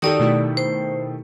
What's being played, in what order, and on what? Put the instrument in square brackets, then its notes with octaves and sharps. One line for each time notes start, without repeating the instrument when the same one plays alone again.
[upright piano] D#3 G4 A4 [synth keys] D#4 F#4 [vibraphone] D5 D#6
[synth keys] B2 A3 E4
[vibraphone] C5